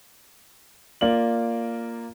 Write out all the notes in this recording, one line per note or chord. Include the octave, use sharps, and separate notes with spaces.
A#3 F4 D5 F#7